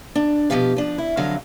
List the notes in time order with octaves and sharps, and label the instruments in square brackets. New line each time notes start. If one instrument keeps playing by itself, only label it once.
[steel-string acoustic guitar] D4
B2 D#3 F3 G4 F5
F3 D4
E4
F2 D3 F#3 F5